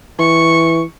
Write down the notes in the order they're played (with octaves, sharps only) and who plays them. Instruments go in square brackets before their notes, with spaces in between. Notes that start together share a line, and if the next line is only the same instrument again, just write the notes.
[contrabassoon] E3 [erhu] C#6